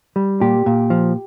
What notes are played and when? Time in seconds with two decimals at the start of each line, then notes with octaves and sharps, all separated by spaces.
0.16 G3
0.41 A#2 G4
0.66 A#2
0.90 F3